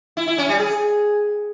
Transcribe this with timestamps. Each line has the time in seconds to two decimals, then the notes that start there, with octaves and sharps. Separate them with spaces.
0.17 E4
0.27 E4
0.38 C#4
0.49 G3
0.60 G#4